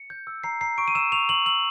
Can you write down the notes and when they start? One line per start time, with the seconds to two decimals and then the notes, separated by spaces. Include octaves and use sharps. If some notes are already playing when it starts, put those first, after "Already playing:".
Already playing: C#7
0.10 G6
0.27 E6
0.44 A#5 C7
0.61 A#5 C7
0.78 C#6 D7
0.88 D#7
0.95 E6 E7
1.12 C#6 F7
1.29 C#6 F#7
1.46 E6 F#7